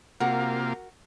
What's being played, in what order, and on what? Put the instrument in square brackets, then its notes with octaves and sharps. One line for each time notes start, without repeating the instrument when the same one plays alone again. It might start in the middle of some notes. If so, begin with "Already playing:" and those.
[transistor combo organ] C3 A#3 F4 [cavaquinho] F#4 A#4